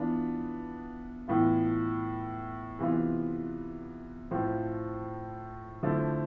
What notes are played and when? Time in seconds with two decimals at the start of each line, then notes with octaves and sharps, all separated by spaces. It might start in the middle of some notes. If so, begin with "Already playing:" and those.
Already playing: E3 B3 D4 F4
1.28 A2 E3 B3 F4
2.79 C3 E3 B3 F4
4.31 A2 F3 C4 F4
5.83 D3 F3 A3 C4 E4